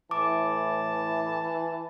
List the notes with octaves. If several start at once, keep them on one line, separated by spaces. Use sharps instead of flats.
A2 E3 A5 D6